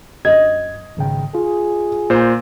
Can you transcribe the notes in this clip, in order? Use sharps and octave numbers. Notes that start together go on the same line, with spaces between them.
F#2 D#5 G#6
G#1 C#3 G5
F4 G#4
A#2 C5